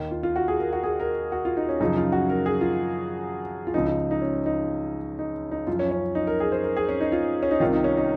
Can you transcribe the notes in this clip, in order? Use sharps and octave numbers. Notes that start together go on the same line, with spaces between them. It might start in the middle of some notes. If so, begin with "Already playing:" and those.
Already playing: D#2 D#3
F4
F4
F#4
G#4
A#4
F#4
G#4
A#4
F#4
F4
D#4
C#4
F#2 C#3 F3 D#4
F4
F#4
A#4
G#4
F4
F4
C#2 C#3 F3 D#4
D#4
D#4
C#4
D#4
D#4
D#4
F#2 F4
F3
C#4
C#4
D#4
A#4
G#4
C5
A#4
G#4
C#4
D#4
F4
C#4
D#4
C2 C3 D#3 F4
D#4
C#4
D#4